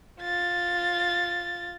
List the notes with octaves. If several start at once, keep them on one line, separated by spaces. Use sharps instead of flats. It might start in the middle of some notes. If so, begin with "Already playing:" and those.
F4 A6